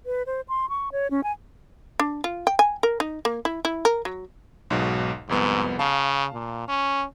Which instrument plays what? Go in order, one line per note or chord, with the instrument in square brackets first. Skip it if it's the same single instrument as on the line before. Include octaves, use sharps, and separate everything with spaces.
[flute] B4
C5
C6
C#6
C#5
C#4
G#5
[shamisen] D4
F4
G5
G#5
A#4
D#4
A#3
E4
E4
A#4
F#3
[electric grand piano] B1 G#2 B2
[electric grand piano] C2 F2 B3 [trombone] G#2
[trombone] C#3 [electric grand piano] F5 A5
[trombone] A#2
C#4